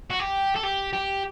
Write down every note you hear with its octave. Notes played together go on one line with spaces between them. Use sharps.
F#4
G4
A4
G4
G4